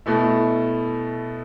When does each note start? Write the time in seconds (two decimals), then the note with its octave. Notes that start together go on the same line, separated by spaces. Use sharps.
0.06 B2 A3 E4